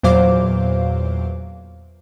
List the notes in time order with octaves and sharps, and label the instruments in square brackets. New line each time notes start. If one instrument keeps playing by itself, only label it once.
[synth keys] E2 A#2 F#3 C5 F5 D6